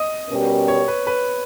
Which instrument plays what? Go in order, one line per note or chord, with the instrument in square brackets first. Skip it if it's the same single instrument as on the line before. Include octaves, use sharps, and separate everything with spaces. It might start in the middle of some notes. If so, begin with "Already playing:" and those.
Already playing: [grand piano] D#5
[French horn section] B2 G3 C#4 G4 A#4
[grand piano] C#5
B4
B4